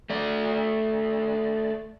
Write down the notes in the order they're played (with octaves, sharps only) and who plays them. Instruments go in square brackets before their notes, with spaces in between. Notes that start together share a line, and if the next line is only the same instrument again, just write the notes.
[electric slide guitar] A3 D5